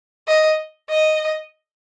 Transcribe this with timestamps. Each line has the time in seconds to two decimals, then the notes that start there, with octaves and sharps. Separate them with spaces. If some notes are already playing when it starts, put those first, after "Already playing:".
0.28 D#5
0.90 D#5